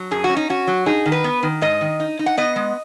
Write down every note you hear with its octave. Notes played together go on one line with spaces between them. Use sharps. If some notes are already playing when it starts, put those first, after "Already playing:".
Already playing: F#3
F#2 G#4
F#4
C#4
D#4
C#4 F#4
F#3
D#4 G#4
D#3
B4
B3
D#3
G#2 D#5
D#3
D#4
D#4
F#5
B3 D#5
G#3